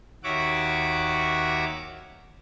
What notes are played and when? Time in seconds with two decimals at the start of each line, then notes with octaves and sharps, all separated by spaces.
0.24 D#2 F#4 C#5 E5 F#5 D6